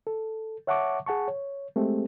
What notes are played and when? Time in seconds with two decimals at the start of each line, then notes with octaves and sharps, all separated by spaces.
0.07 A4
0.67 C#5 E5 F#5 A5 C#6 D6
1.06 G#4 F#5 A5 C#6
1.28 C#5
1.76 G#3 A3 C4 G4 A4